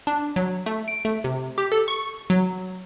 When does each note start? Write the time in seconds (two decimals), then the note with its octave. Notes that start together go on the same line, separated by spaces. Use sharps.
0.07 D4
0.36 F#3
0.66 A3
0.88 D7
1.05 A3
1.24 C3
1.58 G4
1.72 A4
1.88 C#6
2.30 F#3